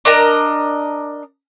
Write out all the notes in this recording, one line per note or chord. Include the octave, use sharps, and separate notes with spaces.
D4 A#4 D#5 A#5